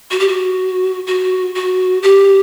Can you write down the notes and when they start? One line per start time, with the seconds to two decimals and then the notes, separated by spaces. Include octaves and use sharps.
0.11 F#4
0.20 G4
0.28 F#4
1.07 F#4
1.55 F#4
2.03 G4